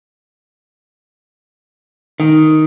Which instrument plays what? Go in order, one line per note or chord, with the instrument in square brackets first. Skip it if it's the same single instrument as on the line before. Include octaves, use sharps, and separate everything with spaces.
[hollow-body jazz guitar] D#3